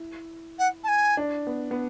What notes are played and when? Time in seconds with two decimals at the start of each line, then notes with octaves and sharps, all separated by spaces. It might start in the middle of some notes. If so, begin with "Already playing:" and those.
Already playing: E4
0.58 F#5
0.83 A5
0.88 G#5
1.17 D4
1.47 B3
1.71 B3